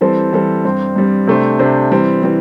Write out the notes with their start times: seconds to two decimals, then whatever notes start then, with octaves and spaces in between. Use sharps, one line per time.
0.01 E3 G3 C4 A4 C5
0.33 E3 G3 C4 A4 C5
0.65 G2 G3 C4
0.96 G2 G3 C4
1.27 C3 A3 D4 C5
1.59 C3 A3 D4 C5
1.92 E3 G3 C4
2.23 E3 G3 C4